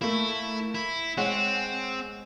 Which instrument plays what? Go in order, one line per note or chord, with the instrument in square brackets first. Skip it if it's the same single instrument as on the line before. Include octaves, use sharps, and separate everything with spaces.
[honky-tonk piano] A3 A#3 [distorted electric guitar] E4
[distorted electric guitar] E4
[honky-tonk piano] G#3 C#5 F#5 [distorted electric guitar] C4